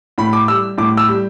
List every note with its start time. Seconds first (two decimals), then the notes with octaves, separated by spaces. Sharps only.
0.18 A2 B5
0.33 D6
0.48 G3 E6
0.78 A2 D6
0.97 E6
1.09 G3